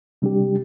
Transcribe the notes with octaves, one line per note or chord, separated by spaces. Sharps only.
C3 G3 D4 G4